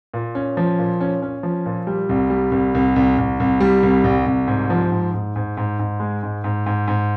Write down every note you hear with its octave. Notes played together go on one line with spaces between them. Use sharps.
A#2
C#4
F3
A#2
C#4
C#4
F3
A#2
G3
C2
G3
C2
C2
C2
C2
C2
G3
C2
C2
C2
G#2
F3
G#2
G#2
G#2
G#2
G#2
G#3
G#2
G#2
G#2
G#2